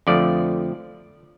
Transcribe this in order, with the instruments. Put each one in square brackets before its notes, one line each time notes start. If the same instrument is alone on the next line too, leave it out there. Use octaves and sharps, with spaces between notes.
[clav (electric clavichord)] F2 D3 F3 A3 D5